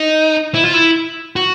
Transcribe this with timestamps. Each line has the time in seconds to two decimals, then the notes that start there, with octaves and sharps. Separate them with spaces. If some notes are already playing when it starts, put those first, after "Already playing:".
Already playing: D#4
0.55 E4
0.64 F4
0.74 E4
1.36 F#4